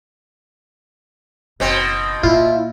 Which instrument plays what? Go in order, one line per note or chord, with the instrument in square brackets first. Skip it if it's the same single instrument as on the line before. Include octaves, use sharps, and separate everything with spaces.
[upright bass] F#1 [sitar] B2 C4
[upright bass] A#2 [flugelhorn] E4 [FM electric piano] F4